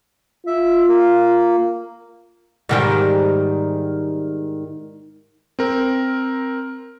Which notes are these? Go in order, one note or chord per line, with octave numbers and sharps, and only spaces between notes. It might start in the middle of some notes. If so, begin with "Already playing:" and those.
F4 E5
A#3
G#2 D#3 G3
C4 A#4